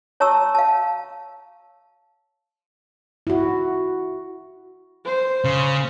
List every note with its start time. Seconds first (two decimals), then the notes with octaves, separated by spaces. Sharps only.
0.20 C#5 A5 A#5 C#6 E6
0.55 F5 A5
3.27 E4 F#4
5.05 C5
5.44 C#3